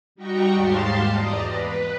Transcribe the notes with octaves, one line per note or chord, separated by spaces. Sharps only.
G3 D#4 F#4 G5 A#5 C#6
D#2 G#2 G4 F5 A5 C6
E2 D5 D#5 A#5
B4